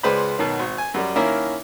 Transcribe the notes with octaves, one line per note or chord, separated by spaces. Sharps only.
C#2 G#3 B4 C5 D5 B5
B2 D#3 F#3
G#1
G#5
F#2 G3
D#3 A#3 C#4 E4 A#4